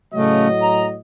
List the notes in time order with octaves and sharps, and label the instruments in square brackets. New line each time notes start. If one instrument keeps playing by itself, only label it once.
[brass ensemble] A2 F#3 D#5 [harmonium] C#3 A3
[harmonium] A#5